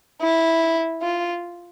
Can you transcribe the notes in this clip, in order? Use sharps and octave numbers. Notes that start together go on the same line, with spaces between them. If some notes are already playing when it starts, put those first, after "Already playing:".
E4
F4